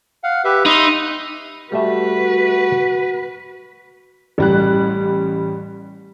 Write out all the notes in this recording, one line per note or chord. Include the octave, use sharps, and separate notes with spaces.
F5 F#5
G4 B4 E5
D#4 E5 B5 C6
G3 A3 F#4 B4 E5
A1 G3 F#6